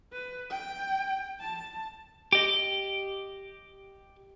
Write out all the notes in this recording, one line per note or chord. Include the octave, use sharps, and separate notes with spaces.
B4
G5
A5
G4 D#5